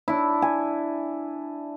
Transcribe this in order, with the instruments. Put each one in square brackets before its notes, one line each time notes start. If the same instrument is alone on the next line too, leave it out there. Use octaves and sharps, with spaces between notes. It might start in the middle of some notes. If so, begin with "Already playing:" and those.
[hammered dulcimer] D4 E4
G#5